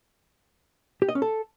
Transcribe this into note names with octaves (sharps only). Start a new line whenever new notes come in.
G4
D#5
C#4
A4